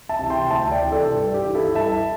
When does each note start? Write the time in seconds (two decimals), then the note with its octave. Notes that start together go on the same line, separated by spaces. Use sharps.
0.09 E5 A5
0.19 C3 E3
0.30 G5 C6
0.51 D2 E5 A5
0.71 D5 G5
0.82 C3 E3
0.92 A4 D5
1.13 G2
1.34 G4
1.45 E3
1.55 E4 A4
1.75 G2 E5 A5